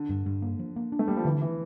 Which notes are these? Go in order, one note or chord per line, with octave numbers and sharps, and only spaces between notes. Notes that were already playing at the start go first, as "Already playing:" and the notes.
Already playing: D3
G2
G2
A#3
F3
A#3
D4
A3
G3 A#3
F3
D3 E3
E3